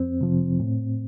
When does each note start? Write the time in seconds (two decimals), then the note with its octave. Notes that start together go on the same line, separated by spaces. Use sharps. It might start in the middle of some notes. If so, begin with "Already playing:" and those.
Already playing: F2 C4
0.21 C3 F3
0.60 A2